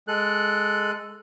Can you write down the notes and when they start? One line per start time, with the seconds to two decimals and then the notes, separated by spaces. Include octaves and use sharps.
0.08 G#3 A4 F#6